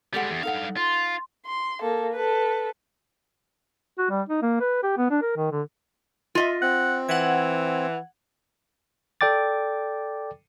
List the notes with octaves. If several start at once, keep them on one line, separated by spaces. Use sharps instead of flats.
G3 G#3 G4 A4 F#5
E2
G2 D#4 A4 F5 F#5
F4 C6
C6
A#3 A4
A4 B4
F#4
G3
D#4
A#3
B4
G4
B3
D4
A#4
D#3
D3
F4 D#5 E5
C4 F#5
E3 F#5 G#6
A4 D5 G5 D6 A6